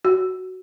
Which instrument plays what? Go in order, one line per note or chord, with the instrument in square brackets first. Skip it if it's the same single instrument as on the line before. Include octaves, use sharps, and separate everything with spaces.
[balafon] F#4